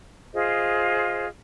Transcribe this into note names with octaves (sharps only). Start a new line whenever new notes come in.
F4 G#4 C5 D#5